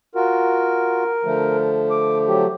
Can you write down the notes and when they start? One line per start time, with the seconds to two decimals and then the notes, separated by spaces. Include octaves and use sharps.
0.15 F4 F#4 A#4
1.25 D3 F3 A3
1.91 D6
2.28 F#3 G4